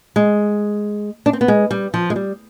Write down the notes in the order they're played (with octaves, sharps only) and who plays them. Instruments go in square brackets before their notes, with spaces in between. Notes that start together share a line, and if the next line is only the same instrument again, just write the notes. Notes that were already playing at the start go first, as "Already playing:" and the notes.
[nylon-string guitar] G#3
D4
C4
B3
G#3
G3
F3
G#3
G3